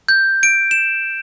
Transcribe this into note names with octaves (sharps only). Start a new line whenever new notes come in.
G6
D7
E7